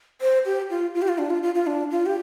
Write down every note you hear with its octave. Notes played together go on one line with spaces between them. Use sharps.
C5
G4
F4
F4
G4
F4
D4
F4
F4
F4
D4
F4
G4